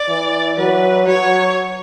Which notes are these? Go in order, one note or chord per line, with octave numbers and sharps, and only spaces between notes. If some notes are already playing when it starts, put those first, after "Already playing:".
Already playing: D5
E3
F#3 B4
F#3 C#5